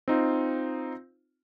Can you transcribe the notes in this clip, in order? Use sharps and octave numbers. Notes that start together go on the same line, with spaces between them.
C4 D#4 F4